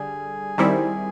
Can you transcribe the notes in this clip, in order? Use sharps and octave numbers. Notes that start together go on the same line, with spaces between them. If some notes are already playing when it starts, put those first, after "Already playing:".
Already playing: D3 G3 G#4
D#3 G3 C4 E4